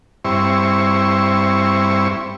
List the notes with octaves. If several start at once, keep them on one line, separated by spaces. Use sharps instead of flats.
G2 C4 E4 C#6